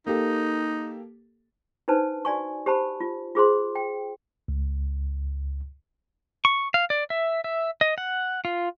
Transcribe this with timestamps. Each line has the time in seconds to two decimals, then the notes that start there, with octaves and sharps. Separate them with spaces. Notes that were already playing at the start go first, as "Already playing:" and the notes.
0.07 A#3 D#4 G4 A4
1.88 D4 D#4 B4 C5 A5
2.25 F#4 D5 G#5 C#6
2.66 G4 C5 A5 B5
3.00 F4
3.35 F4 G#4 C5 C6
3.75 G5
4.48 C#2
6.45 C#6
6.74 F5
6.90 D5
7.10 E5
7.44 E5
7.81 D#5
7.98 F#5
8.45 F4